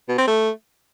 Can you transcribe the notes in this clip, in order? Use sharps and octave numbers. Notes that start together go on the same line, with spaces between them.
B2
C4
A3